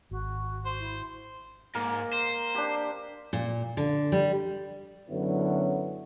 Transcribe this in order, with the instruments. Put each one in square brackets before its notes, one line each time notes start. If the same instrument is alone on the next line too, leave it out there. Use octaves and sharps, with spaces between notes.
[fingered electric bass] G#1 [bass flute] F#4
[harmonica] C5
[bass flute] E4
[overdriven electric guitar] G#2 [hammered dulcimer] A#3 A#4
[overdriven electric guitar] C5
[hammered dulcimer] D4 G4
[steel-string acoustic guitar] A#2
D3
G3
[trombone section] F#2 D3 F#3 B3 C#4 E4